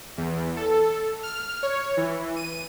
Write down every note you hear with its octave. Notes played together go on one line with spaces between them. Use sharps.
E2
A4
F6
C#5
E3
D#7